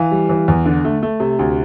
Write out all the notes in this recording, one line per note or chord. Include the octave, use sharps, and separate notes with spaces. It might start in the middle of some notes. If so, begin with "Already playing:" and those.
Already playing: E3 F5
G3
E3
E2
D3
A3
A3
C3
D2